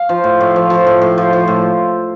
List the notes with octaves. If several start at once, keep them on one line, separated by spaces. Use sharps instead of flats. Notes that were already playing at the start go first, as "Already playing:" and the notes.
Already playing: F5
F3
A2
A2
F3
F3
A2
A2
F3
F3
A2